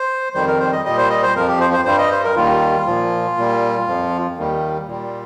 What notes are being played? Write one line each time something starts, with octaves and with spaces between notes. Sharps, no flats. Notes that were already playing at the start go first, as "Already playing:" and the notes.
Already playing: C5
F2 D#3 G3 C5
A#4
C5
D#5
A#2 G3 D#5
C5
D#5
C5
F2 F3 A#4
G4
C5
C5
G2 G3 C5
D#5
C5
A#4
D#2 D#3 G3 F4
A#2 F3
A#2 G3
F2 F3
D#2 D#3 G3
A#2 G3